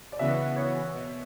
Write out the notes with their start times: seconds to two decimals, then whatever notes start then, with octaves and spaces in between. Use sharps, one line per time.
0.12 D5
0.19 C#3 E3 B3 F#4 E5
0.56 C#5
0.93 B2